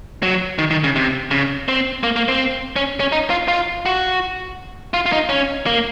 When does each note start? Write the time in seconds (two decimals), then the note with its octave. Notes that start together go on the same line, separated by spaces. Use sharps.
0.23 F#3
0.58 D#3
0.71 D#3
0.84 C#3
0.96 C3
1.31 C#3
1.68 C4
2.03 A#3
2.16 A#3
2.28 C4
2.76 C#4
3.00 C#4
3.12 D#4
3.30 F4
3.48 F4
3.86 F#4
4.94 F4
5.06 F4
5.12 D#4
5.29 C#4
5.66 A#3